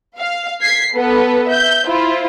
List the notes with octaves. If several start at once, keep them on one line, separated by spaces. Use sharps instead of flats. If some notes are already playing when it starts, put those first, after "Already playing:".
F5
G#6 B6 C7
B3 A4 B4
E5 G6
E4 F4 C5